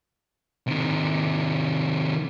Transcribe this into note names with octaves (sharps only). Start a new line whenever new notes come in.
C3 D#3